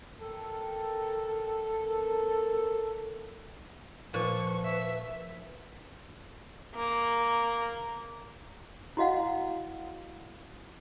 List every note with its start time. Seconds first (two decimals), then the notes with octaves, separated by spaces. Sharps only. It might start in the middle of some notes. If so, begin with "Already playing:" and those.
0.22 A4 A#4 G5
1.78 C4 A#4
4.14 A#2 F3 B4 C#6
4.65 E5
6.75 A#3
8.97 E4 F#4 D#5 F5 F#5